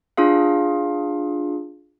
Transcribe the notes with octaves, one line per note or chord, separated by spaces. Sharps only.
D4 F4 G#4 F5